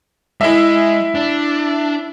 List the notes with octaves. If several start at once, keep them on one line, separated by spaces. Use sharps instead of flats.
G#3 E4 G#4 E5
D4